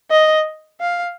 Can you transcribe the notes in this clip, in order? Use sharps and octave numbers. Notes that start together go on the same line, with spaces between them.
D#5
F5